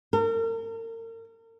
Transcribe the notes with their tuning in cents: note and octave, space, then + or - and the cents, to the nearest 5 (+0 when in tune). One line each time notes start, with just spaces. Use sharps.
A#4 -40